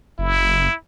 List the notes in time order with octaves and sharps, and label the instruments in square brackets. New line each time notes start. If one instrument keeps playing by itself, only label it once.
[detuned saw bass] F#1 [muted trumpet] E4